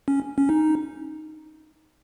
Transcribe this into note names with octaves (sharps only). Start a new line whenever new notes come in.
C#4
C#4
D#4